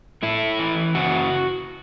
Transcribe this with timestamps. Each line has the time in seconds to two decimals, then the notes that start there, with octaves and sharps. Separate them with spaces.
0.23 A3 E4
0.59 E3
0.95 C#3 F#4